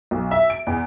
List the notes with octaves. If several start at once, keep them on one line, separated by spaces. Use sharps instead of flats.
B1
E5
D7
E2